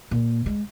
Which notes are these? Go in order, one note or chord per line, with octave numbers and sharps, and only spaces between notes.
A#2
G#3